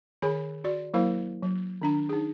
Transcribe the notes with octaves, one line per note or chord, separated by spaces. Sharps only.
D#3 G#4 C#5 G#5 B5
F#4 D5
F#3 A#3 E4 A#4 C5 F5
F#3
D#3 D4 A#5
D#4 G#4